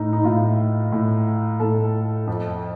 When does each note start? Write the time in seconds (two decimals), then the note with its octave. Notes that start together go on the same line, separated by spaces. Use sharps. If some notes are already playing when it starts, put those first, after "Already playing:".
Already playing: A2 D#4
0.13 D#4
0.24 A2 F4
0.92 A2
1.60 A2 A4
2.27 F2